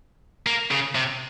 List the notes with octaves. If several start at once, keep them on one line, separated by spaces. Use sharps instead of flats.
A#3
C#3
C3